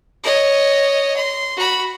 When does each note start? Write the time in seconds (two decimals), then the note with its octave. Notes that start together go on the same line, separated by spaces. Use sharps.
0.24 C#5 D#5
1.17 C6
1.57 F#4 B5